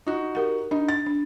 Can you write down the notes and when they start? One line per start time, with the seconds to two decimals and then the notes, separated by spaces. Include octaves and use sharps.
0.07 D#4 F#4
0.35 G4 A#4 F#5
0.71 D4 D#4
0.89 A6
1.06 D4